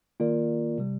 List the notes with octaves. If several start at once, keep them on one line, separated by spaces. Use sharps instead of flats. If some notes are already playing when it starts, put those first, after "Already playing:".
D#3 A#3 F4 A#4 D5
C3 G3